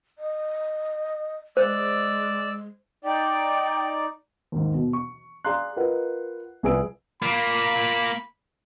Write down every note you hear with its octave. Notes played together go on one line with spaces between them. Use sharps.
D#5
G#3 C5 D5 E6
D#4 D5 G5
D#2 G#2
B2
C#6
G#4 D5 F5 A#5 C6 F#6
F4 A#4 B4 D#5 F#5
C2 F3 G#4 B4 E6 D7
A#3 F4 B5